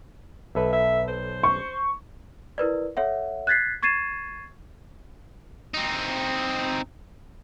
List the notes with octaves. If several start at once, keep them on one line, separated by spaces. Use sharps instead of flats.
B1 A4 B4 E5
E5
C5
C#6
E4 A#4 B4 D5
A4 C#5 E5 F#5
F#6 G#6 A6 B6 C7
C#6 G#6 A6 C7 D#7 E7
C4 D#4